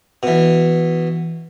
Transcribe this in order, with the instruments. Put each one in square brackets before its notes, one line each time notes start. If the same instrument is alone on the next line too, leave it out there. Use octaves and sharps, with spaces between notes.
[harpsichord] B2 E3